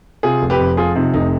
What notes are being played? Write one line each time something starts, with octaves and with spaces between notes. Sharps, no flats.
C3 F4 G#4
F1
G4 B4
F2
F3 F4 G#4
C3 D#4
F1 D#4